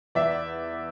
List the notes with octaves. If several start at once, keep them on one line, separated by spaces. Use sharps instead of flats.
E2 D5 E5